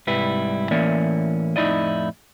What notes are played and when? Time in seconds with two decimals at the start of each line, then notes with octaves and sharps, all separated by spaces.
0.07 C2 G#2 G3 E4 B4
0.71 A2 E3 A#3 C#4 D5 E5
1.56 F2 A2 D#4 E4 D5 D#5